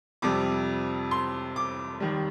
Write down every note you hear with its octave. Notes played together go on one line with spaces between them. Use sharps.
F2 C3 G3 D6
C6
D6
D#2 D#3 G3